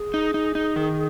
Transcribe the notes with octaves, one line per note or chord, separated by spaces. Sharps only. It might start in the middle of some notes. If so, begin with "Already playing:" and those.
Already playing: G#4
D#4
D#4
D#4
D#3